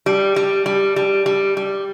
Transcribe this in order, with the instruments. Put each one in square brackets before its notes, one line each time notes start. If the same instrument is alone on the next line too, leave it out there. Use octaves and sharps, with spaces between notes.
[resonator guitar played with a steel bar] G3
G3
G3
G3
G3
G3